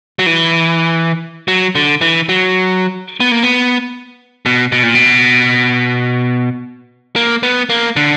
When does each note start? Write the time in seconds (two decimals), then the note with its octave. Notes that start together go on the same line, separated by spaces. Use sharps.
0.19 F#3
0.26 E3
1.48 F#3
1.75 D3
2.01 E3
2.29 F#3
3.20 B3
3.32 A#3
3.43 B3
4.46 B2
4.72 B2
4.83 A#2
4.95 B2
7.16 A#3
7.43 B3
7.70 A#3
7.96 D3